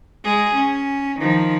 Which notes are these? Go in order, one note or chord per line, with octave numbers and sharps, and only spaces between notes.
G#3 G#4
C#4
D#3 F3